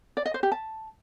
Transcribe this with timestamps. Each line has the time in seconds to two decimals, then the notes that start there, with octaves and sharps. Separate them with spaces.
0.17 D5
0.26 D#5
0.34 C5
0.43 G4
0.52 A5